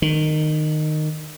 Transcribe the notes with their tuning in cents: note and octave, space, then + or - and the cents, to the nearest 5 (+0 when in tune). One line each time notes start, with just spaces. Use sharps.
D#3 -20